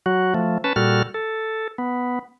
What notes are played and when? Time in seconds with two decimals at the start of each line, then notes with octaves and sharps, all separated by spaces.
0.06 F#3 F#4
0.34 F3 A3
0.64 C#4 B4 A5
0.76 A#2 G3 F#4 A4 F6
1.14 A4
1.78 B3